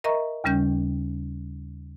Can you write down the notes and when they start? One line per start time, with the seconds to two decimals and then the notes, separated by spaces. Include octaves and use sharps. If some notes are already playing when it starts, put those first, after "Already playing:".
0.04 A#4 D#5 E5 A#5 C#6
0.44 D#2 C#3 G3 C#4 G6